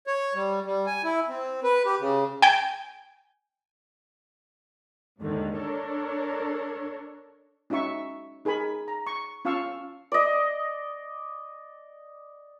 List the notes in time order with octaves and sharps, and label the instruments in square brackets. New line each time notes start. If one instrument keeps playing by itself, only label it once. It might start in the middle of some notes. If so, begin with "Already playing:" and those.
[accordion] C#5
G3
G3
G#5
E4
C4
B4
G4
C#3
[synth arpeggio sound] G5 G#5
[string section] D#2 G#2 D3 D#3
D4 A4 A#4 C#5
[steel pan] C#4 D#4 F#4 E5 C#6
D#4 G#4 A#4 G#5 B5
A#5
C#6
C#4 F4 F5 A5 C#6 E6
[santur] D5 D#5